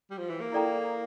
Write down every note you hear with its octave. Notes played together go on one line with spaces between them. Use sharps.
G3
F3
E3
A#3
E4 A4 D5 G5 A#5